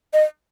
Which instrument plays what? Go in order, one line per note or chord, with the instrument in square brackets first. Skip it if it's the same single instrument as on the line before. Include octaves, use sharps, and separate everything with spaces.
[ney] D#5